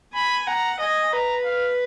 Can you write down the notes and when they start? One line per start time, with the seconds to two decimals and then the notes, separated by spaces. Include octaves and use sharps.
0.14 G#5 B5
0.47 F#5 A#5
0.80 D#5 G#5
1.12 B4 A#5
1.45 F5